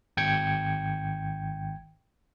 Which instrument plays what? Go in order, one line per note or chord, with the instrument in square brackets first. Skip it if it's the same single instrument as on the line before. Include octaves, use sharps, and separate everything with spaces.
[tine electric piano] G#1 G5 G#6 C#7